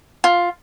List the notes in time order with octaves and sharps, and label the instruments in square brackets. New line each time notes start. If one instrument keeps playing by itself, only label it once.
[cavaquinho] F4